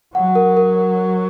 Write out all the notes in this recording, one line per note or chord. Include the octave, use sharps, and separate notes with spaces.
F#3 F#5
A#4
A#4